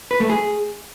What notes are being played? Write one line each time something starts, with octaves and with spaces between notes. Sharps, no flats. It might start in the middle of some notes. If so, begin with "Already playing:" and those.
B4
A3
G#4